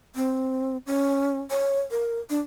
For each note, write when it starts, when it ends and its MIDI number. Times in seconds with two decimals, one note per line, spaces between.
0.15 0.77 60
0.87 1.40 61
1.51 1.80 73
1.91 2.19 70
2.30 2.40 62